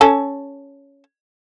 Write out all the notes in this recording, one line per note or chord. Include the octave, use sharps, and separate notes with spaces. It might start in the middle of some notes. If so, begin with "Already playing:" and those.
C#4 A4